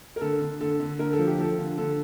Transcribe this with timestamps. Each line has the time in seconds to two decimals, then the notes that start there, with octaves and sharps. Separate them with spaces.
0.16 A#4
0.21 D3 A4
0.41 D3
0.61 D3 A4
0.80 D3
0.99 D3 A#4
1.13 A4
1.19 F3
1.27 G4
1.38 F3 A4
1.58 D3
1.78 D3 A4